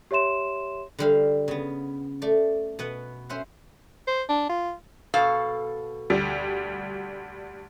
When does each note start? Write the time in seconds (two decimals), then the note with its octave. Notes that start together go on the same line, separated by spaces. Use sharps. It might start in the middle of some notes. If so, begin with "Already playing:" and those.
0.11 G4 C#5 E5 C6 E7
0.99 D3 G3 F5
1.48 C#3 B3
2.22 A3 D5
2.79 B2 B3 F#5
3.29 C#4 C5 E5 F#5
4.07 C5
4.29 D4
4.49 F4
5.14 B2 A4 F5
6.10 D2 G3